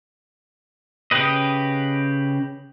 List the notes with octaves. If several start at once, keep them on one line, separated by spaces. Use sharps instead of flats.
C#3 G4 B4 D#5